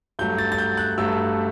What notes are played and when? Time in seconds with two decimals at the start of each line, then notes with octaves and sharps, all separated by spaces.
0.19 G2 F#3 A3 G6
0.38 A6
0.52 A6
0.58 G6
0.77 F#6
0.98 G2 F#3 A3 E6